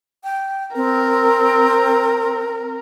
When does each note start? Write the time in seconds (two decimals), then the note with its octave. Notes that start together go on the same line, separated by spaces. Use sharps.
0.24 G5
0.76 C4 A#4